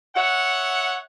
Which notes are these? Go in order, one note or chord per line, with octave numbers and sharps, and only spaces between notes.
C#5 E5 F#5